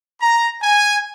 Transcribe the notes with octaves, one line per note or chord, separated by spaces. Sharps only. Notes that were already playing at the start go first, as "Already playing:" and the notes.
A#5
G#5